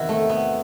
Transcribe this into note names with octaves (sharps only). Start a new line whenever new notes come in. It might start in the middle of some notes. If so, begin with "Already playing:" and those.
Already playing: E2 C3 D#3 E4 F#4
A3
B3